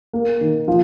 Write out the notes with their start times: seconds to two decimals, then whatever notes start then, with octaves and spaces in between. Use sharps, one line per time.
0.13 A#3
0.41 D#3
0.68 F3